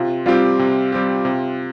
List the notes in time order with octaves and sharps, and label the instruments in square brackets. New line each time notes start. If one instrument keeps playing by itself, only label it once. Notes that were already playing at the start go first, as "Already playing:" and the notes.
Already playing: [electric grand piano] C3 [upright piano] F4
[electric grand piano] G3 C4 G4 [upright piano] F4
[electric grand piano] C3
G3 C4 G4
C3